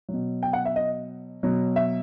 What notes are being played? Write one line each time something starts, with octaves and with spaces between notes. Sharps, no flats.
F#3
B2
G5
F#5
E5
D#5
B2 F#3
E5